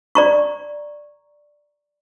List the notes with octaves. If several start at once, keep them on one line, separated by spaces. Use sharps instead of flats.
D5 A#5 C#6